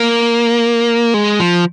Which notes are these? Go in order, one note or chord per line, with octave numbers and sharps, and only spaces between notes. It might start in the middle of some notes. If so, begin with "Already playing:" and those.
Already playing: A#3
G#3
F3